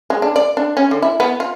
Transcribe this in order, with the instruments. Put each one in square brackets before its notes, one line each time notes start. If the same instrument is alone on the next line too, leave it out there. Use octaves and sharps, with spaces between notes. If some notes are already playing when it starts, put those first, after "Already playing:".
[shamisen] G#3
D4
D5
D4
C#4
D3
E4
B3
F4